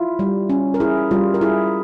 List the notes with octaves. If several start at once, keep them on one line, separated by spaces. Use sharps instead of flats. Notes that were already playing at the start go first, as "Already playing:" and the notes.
Already playing: E4 F4
G3
C#4
A#4
E4 G#4
G3 F4
A#4
E4 G#4